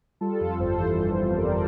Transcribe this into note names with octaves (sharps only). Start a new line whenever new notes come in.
G3 F4 A4
F2
G1 A4 C5
E3
G1
G3
G1 A#4 D5